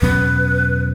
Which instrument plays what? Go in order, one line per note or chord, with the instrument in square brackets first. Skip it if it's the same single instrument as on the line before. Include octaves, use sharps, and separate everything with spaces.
[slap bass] E2 B2 F#3 C#4 [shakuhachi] B4